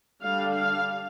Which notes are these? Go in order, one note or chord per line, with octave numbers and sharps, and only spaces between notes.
D3 G3 D4 F5
F5